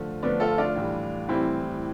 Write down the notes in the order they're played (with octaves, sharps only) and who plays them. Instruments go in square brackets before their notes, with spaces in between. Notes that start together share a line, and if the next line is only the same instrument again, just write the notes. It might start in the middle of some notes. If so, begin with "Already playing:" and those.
Already playing: [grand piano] D3 F3 A3
[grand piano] D3 F3 A3 [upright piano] B3 D4
[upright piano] F4 A4
D4 F4
[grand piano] A2 E3 G3
[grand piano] A2 E3 G3 [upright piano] C4 E4